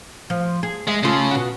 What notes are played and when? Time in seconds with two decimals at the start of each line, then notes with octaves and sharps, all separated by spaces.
0.30 F3
0.63 G#4
0.87 G#3 E5
1.03 C#3 A3 F4
1.31 B2 F#4